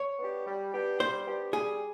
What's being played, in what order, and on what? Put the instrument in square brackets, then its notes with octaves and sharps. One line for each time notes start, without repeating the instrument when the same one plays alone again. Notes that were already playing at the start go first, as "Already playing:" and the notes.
Already playing: [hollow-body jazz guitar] C#5
[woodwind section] B3 D4 G4
G3
B3 D4 G4
[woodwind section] G3 [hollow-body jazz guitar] C5
[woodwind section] B3 D4 G4
[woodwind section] G3 [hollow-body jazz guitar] G#4